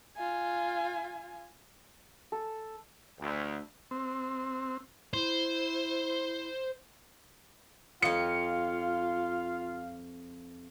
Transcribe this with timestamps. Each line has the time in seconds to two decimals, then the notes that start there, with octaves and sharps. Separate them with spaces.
0.16 F4 G#5
2.32 A4
3.19 D2
3.91 C4
5.13 E4 C5
8.02 F2 F4 D#5 F5 C#7